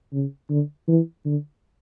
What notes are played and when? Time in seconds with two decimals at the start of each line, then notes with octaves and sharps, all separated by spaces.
0.13 C#3
0.50 D3
0.88 E3
1.25 D3